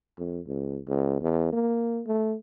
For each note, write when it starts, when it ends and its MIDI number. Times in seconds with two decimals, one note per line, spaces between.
0.18 0.40 41
0.47 0.80 37
0.88 1.17 37
1.21 1.53 40
1.53 2.02 58
2.07 2.36 57